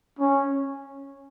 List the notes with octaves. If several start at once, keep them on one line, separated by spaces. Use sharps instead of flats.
C#4